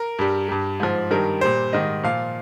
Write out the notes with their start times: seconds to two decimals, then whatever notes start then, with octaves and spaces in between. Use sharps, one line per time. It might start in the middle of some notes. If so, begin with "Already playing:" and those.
Already playing: A#4
0.19 G2 G3
0.48 G2 G3
0.80 G#2 F3
1.11 G2 D#3 G3 A#4
1.41 A#2 G3 C5
1.73 G#2 D#3 G3 D#5
2.04 A#2 F3 F5